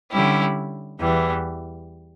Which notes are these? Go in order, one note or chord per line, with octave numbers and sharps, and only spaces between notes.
D3 G3 C#4 E4 G4
E2 E3 G3